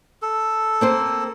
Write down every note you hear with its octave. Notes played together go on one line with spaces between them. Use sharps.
A4
A#3 C4 C5